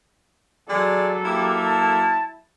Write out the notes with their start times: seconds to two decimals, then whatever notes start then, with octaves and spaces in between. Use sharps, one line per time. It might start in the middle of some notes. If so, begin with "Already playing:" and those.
0.70 F#3 G#3 A4 D5
1.25 A#3 E4 G4
1.67 A5